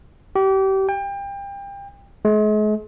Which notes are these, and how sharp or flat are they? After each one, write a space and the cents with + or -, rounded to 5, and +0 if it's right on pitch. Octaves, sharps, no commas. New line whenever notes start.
G4 -30
G5 +30
G#3 +40